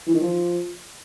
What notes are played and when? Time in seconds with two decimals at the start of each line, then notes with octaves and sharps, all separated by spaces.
0.07 E3
0.14 D#3
0.21 F3